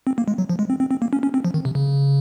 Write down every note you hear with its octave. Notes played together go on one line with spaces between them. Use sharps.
C4
A#3
G#3
F#3
F3
G#3
C4
C4
C4
A#3
C#4
C#4
C4
F3
D#3
C3
C#3